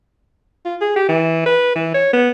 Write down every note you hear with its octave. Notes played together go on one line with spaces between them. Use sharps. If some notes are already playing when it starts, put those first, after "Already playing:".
F4
G#4
G4
E3
B4
E3
C#5
B3